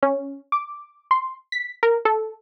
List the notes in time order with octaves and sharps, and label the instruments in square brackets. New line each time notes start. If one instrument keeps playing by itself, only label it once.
[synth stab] C#4
D6
C6
B6
A#4
A4